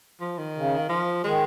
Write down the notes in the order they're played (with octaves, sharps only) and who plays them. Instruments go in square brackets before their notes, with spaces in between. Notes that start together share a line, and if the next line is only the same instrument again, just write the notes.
[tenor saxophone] F3
D#3
[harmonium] C#3
[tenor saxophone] F3
[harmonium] D#3 [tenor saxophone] G#3